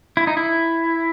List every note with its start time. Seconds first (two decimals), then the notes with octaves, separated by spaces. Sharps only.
0.17 E4
0.27 D#4
0.37 E4